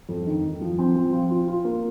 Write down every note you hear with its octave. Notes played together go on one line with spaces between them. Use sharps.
F2
D#3
F2
F3
C4
F3
F4
F4
F4
A#3